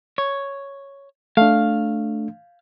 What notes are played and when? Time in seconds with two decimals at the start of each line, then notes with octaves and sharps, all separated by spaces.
0.18 C#5
1.37 A3 D4 F5